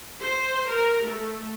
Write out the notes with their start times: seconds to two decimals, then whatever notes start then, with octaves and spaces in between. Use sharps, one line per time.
0.21 C5
0.69 A#4
1.07 A3